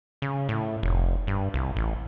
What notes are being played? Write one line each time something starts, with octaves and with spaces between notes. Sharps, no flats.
C#3
A2
F1
G2
C2
A1